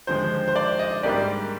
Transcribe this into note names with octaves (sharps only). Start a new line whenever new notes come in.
D#2 D3 F3 G#3 C5
C5
D5
D#5
G#2 G3 A#3 D4 G4 D5